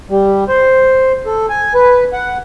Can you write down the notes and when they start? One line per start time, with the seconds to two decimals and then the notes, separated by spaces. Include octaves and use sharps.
0.10 G3
0.48 C5
1.26 A4
1.49 G#5
1.74 B4
2.13 F#5